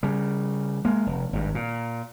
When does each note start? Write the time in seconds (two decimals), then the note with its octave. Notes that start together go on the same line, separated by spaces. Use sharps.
0.03 C#3 G3
0.85 G#3 A#3
1.06 F1
1.33 G#1 G2
1.55 A#2